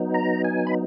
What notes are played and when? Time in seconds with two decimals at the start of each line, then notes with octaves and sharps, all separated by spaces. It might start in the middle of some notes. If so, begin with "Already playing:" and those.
Already playing: F#3 B3 D#4
0.14 A#5
0.44 G#5
0.67 B5